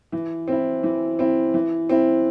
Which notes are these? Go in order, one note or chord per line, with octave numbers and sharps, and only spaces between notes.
E3
C4 E4
E3
C4 E4
E3
C4 E4